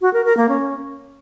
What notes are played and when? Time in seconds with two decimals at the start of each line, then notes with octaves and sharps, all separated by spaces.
0.01 F#4
0.13 A#4
0.25 A#4
0.37 A#3
0.49 C#4